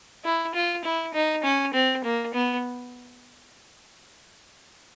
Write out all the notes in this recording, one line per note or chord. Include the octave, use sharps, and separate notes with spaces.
E4
F4
E4
D#4
C#4
C4
A#3
B3